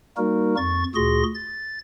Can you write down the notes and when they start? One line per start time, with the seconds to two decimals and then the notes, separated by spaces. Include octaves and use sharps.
0.17 G3 A#3 D#4 F#4 A#4
0.57 F2 C#6 A6
0.95 D2 A#2 F#4 G#4 C6 A#6
1.34 A6